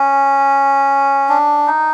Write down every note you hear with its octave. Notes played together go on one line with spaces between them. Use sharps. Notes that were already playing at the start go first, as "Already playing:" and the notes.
Already playing: C#4
D4
D#4